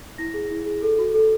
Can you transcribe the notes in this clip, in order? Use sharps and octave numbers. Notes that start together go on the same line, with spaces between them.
E4 A#6
G#4
E4
G#4
A4
F#4
A4